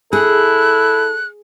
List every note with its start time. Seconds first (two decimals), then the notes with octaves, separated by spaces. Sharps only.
0.13 E4 G#4 A4 F#6